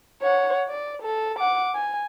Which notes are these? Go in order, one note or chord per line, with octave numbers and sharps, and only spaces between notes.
C#5 F#5
D5
A4
F#5 D6
G#5